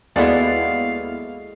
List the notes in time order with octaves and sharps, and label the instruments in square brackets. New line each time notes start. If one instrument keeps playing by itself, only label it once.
[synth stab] D#2 B3 E4 [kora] G#3 A4 [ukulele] F#4 D5 [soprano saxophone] F5